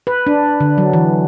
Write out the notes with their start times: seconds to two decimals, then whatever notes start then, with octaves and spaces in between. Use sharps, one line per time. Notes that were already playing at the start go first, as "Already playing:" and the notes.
0.07 B4
0.27 D4
0.60 D3
0.78 F#3
0.93 E3